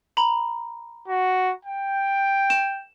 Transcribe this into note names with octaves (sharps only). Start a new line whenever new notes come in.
A#5 B5
F#4
G5
E7